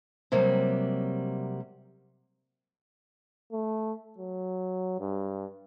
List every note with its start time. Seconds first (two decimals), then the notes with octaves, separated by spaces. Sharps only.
0.32 C3 F#3 G3 A#3
3.52 A3
4.18 F#3
5.00 G2